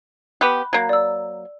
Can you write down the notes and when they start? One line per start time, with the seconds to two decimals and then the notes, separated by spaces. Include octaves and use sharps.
0.41 B3 G4 B5 F#6
0.73 F#3 A#3
0.89 D5 E6